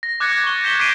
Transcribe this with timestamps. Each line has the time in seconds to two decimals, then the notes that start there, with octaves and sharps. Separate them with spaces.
0.03 A#6
0.20 D6 F#6 G#6 A6 C#7
0.44 C#6 G7
0.64 G6 B6 E7 G7
0.80 D6 B6 C7 D7 D#7 G7